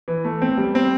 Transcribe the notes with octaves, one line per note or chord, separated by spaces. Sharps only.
E3
A3
C4
G3
C4